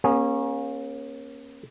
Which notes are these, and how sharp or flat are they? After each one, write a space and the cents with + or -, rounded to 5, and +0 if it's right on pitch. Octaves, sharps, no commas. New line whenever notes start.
A#3 +30 C#4 -20 G#4 -20